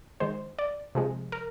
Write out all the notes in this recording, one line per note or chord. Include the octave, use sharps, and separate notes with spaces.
D#3 G#3 C5
D5
C3 F3 G#3
A#4